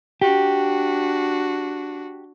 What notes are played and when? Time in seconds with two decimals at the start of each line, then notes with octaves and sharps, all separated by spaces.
0.22 D4 F#4 G4